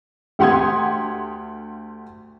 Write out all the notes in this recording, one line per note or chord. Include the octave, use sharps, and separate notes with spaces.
D2 G4 F#5 C6 D#6 G#6